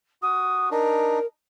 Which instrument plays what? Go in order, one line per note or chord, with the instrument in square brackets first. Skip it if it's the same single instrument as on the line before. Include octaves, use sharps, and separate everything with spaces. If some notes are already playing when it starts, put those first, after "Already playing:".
[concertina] F#4 [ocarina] D#6
[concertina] D4 D#4 [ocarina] A#4